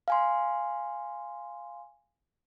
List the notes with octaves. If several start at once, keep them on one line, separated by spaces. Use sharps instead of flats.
F5 G#5 C6